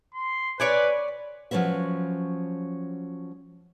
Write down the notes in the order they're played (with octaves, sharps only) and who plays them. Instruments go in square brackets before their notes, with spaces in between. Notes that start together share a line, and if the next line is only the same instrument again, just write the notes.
[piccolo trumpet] C6
[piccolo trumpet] B4 [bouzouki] C#5 D5 G#5
[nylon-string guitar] F3 F#3 C#4 B4 E5